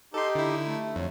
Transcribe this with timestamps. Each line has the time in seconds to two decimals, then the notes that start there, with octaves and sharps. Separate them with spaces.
0.14 D#4 G4 A4 C6
0.35 D3 E4
0.66 A3
0.96 F2 F#3